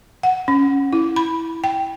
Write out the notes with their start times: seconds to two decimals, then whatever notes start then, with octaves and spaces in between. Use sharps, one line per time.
0.23 F#5
0.48 C#4
0.93 E4
1.16 B5
1.64 G5